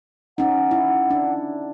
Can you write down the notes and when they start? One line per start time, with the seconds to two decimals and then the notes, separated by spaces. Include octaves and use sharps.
0.38 C#4 D#4 F#5
0.71 E4
1.10 D4